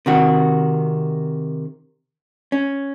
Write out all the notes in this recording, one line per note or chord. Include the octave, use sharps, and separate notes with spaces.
C3 D#3 F#4
C#4